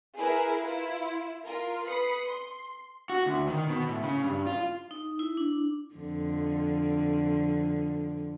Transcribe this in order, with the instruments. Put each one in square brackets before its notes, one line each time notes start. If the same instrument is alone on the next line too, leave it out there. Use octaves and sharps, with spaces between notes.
[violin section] E4 G#4 A#4 B4
E4 F4
F4 A#4
B4 B5 D#6 C7 C#7
C6
[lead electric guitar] F#4
D2
D#3
B2
A2
C#3
G2
F4
[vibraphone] D#4
E4
D4
[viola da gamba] F2 D3